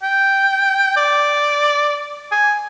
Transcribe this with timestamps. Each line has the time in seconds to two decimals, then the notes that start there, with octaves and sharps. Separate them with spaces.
0.03 G5
0.97 D5
2.32 G#5